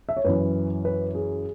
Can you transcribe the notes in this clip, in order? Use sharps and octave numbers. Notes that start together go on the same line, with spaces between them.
E5
C#5
F#2 E3 B4
B4
G#4